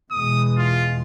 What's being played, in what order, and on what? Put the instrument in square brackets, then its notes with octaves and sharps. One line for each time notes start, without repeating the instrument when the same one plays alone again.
[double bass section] E2 B2 G#3 [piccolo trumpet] D#6
[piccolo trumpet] F4